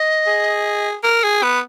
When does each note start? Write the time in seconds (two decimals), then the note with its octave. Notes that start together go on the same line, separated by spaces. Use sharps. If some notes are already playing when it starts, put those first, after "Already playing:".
Already playing: D#5
0.27 G#4
1.03 A#4 A#5
1.23 G#4
1.42 B3 B5